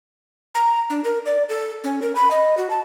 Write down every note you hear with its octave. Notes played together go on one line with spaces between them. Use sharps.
A#5
D4
A#4
D5
A4
C#4
A#4
B5
D#5
F#4
A5